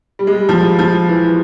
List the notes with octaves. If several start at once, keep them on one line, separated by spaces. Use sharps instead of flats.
G3
G#3
G3
F3
F3
E3